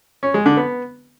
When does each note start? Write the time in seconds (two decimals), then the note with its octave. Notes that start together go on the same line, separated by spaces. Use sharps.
0.23 C#4
0.34 G#3
0.46 D3
0.57 B3